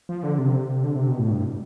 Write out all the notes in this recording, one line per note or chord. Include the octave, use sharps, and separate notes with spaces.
F3
D3
C3
D3
C3
B2
A2
G2